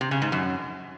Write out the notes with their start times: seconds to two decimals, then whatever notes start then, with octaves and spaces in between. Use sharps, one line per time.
0.01 C3
0.11 C#3
0.22 G#2
0.32 F#2